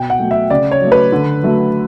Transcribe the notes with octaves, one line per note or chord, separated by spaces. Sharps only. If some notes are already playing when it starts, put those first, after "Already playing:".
Already playing: B2 G5
F#5
F#3 A3
E5
C#3 D5
C#5
F#3 A3
B4
D3
F#3 A3